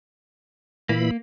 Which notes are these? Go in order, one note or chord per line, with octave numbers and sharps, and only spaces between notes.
A#2 E3 A#3 B5